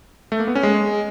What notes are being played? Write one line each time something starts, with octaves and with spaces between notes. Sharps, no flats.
A3
A#3
B3
C#4
G#3